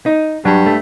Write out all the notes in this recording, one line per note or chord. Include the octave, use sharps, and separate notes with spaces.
D#4
G2 F#3 F#4
A3